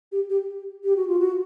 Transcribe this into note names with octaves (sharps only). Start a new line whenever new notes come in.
G4
G4
G4
F#4
F4
F#4